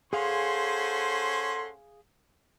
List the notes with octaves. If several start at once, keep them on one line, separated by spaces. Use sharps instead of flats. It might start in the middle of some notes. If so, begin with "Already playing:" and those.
C#4 G#4 A4 C5 F5 F#5 G#5 C6